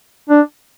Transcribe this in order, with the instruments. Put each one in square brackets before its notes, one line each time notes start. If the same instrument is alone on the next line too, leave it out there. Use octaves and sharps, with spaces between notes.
[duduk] D4